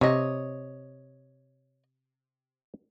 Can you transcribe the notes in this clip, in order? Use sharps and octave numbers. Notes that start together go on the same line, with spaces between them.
C3 C#5 D#5